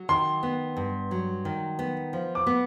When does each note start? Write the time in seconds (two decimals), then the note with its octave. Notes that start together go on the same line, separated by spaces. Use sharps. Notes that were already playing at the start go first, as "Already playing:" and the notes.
Already playing: F#3
0.09 D#3 C6
0.43 B3
0.77 G2
1.11 F#3
1.45 D#3
1.79 B3
2.13 F3
2.35 D6
2.47 B3